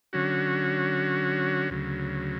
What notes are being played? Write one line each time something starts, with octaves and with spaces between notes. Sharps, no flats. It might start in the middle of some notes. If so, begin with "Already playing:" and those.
D3 F#3 C#4 F#4
D2 C#3 F#3